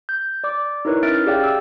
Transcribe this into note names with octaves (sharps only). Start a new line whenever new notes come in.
G6
D5 D6
D#4 E4 A#4 B4 C#5
C#4 E5 F6 F#6 A6 D7
G4 G#4 D5 F5 G5
E6